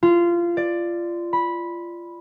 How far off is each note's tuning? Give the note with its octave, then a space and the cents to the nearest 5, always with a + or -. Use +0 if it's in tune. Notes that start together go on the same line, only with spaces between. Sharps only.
F4 -20
D5 +10
B5 -10